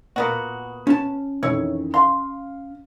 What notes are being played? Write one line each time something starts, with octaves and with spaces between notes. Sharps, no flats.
A#2 A#3 B3 F#4 D#6
C#4 A5
F2 D#3 E3 E4 C#5
F5 C6